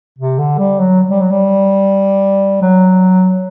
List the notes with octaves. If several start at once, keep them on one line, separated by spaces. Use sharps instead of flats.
C3
D3
G3
F#3
G3
F#3
G3
F#3